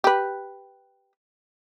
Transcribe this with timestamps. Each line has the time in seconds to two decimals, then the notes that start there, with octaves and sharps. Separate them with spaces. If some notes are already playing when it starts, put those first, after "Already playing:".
0.04 G4 B4